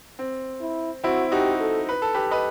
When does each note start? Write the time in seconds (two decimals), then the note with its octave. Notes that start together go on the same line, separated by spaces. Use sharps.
0.19 C4
0.61 E4
1.04 C4 E4 F#4
1.32 D#4 F#4 G4
1.60 A4
1.89 B4
2.02 A4
2.14 G4 B4
2.31 B4 D#5